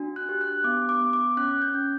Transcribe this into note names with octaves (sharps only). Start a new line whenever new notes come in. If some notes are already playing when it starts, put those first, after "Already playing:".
Already playing: D4 F#4
F#6
G4
F#6
B3 D6
D6
B3
D6
C#4 F#6
G6
C#4